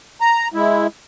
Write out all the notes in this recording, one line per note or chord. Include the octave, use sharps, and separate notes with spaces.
A#5
G#3 E4